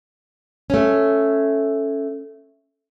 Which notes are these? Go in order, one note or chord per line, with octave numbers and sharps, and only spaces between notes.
A3 C#4